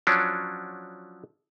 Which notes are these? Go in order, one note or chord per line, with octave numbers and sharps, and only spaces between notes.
F3 F#3 C#4 D4